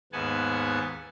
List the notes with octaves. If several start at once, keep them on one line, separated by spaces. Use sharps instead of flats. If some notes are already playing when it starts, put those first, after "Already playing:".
D#2 G#2 B3 F#5 G#5 A5